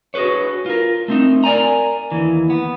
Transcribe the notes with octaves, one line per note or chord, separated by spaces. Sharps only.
F#4 G#4 A#4 B4 C#5
F4 A#4
A3 C4 D#4
A#4 D5 G#5 A#5
D#2 E3
B3